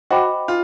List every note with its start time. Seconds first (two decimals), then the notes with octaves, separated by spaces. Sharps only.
0.10 F#4 C5 D#5 G5 B5 D6
0.48 F4